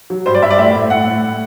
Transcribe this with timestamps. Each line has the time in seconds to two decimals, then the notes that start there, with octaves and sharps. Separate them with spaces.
0.10 F#3
0.26 G2 C5
0.34 D5
0.42 G2 E5
0.50 D5
0.58 A2 E5
0.75 A2
0.90 A2 F#5
1.07 A2